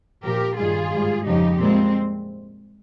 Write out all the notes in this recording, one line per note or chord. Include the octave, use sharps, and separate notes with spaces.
A#2 F3 G4 A#4
G2 D#3 G3 F4 G#4
G#2 G3
F2 C#3 F3 D#4 G4
A#2 G3 G#3 C4